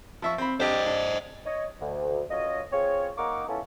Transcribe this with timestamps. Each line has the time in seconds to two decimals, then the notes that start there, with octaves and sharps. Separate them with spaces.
0.22 F3 E5 C#6
0.38 C4 B5
0.60 D4 G4 C5 D5 D#5
0.86 D4
1.45 C#5 D#5
1.80 D2
2.30 F#2 F4 C#5 D#5
2.72 C4 F4 G#4 C#5
3.17 A#3 D#4 A#4 F#5 C#6 D6
3.48 B3 C#4 E4 F4 A4